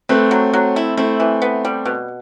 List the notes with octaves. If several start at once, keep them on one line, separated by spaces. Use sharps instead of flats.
A3 C4 B4
F#3
F#3
E4
A3 C4 E4
E3
B3
G3
B2